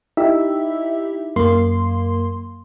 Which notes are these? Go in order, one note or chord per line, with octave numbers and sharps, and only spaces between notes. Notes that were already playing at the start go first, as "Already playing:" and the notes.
D#4 E4 G4 E5
F#2 A#3 C6